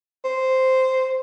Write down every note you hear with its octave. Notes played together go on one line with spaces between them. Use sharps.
C5